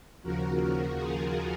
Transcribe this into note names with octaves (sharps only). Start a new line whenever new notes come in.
D#2 C#3 F3 F#4 A#4
F4 G#4